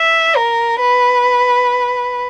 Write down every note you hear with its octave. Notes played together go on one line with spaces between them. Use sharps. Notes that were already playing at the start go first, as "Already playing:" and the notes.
Already playing: E5
A#4
B4